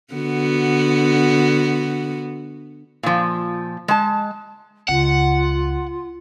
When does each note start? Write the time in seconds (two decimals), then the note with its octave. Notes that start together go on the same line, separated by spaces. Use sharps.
0.13 D3 B3 F#4
3.03 A#2 F3
3.88 G#3 A5
4.89 C#2 F4 F#5